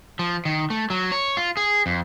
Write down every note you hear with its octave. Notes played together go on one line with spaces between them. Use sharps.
F3
D#3
A3
F#3
C#5
F4
G#4
F2